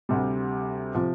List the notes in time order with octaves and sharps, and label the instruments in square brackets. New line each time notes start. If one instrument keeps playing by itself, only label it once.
[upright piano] D2 C3 G3
C3 F3